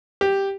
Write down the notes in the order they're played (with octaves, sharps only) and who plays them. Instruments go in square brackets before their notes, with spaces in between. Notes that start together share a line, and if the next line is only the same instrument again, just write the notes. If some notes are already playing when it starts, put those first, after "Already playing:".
[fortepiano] G4